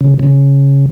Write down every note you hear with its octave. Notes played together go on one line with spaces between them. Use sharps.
C#3
C#3